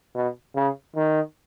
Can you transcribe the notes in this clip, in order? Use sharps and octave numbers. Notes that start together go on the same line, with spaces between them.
B2
C#3
D#3